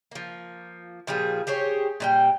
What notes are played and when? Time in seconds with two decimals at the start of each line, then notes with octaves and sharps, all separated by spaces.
0.11 F3 A#3
1.07 A#2 F3 G3 G#4
1.47 G4 G#4 C5 C#5
2.00 A#2 G3 G5